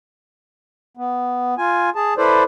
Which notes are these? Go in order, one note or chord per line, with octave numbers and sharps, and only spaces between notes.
B3
F4 G#5
G#4 A5
E4 A4 B4 C5 D5